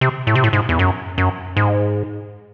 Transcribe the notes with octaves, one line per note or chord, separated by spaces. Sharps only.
C3
A2
C3
A2
G#2
E2
F#2
F#2
G#2